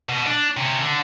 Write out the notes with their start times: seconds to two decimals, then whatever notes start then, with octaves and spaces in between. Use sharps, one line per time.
0.09 B2
0.27 D4
0.57 C3 C#4
0.81 D3